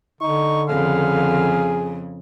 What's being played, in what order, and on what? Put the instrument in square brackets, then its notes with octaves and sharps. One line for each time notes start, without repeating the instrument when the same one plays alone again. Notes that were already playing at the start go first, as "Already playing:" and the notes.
[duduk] D3 [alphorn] D#4 [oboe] C#6
[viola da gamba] F2 C#3 [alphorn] G#4 [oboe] F5